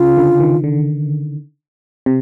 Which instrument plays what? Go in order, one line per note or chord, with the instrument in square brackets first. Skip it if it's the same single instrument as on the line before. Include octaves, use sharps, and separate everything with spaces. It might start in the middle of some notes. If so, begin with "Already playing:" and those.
Already playing: [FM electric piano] C#3 [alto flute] F4
[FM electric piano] D3
D#3
D3
C3